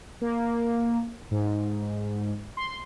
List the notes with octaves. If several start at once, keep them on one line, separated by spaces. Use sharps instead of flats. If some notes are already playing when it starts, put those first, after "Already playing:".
A#3
G#2
C6